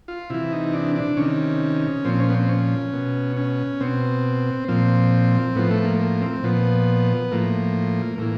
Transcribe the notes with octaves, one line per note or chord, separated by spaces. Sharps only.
F4
C3 E3 E4
D#4
D4
D4
C3 D#3 C#4
A#2 F3 C4
C#4
B3
C4
C#4
B2
C#4
B2 C4
A#2 F3 C4
A2 F3 B3
A3
A#3
A#3
C4
A#2 F3 B3
A2 F3 A#3
A2 E3 A#3